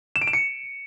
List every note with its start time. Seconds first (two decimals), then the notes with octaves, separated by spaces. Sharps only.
0.16 E7
0.21 D7
0.27 E7
0.33 C#7